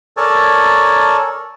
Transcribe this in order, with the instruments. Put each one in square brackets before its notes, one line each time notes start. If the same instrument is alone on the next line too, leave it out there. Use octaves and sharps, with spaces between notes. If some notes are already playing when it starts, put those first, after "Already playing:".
[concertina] A4 A#4 C#5 D5 G#5 A5